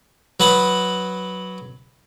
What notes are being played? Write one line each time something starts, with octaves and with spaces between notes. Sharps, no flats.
F#3 B4 A5 B5 D#6